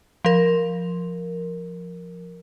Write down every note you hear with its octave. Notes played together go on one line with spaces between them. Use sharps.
F3 A#4